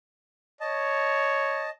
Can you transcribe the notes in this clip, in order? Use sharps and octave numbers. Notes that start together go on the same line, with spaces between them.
C#5 D#5 A5